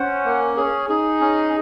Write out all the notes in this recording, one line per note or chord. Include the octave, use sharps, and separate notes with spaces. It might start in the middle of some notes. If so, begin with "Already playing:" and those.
Already playing: C#4 C5 F#5
A#3
C#4 G#4
D#4 G#4
C#4